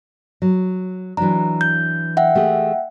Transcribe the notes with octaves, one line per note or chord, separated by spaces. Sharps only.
F#3
E3 F#3 D4 A#5
G6
E5 F#5 G5
A3 G4 G#4